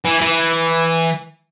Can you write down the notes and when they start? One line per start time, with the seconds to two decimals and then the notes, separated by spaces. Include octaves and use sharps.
0.05 E3
0.21 E3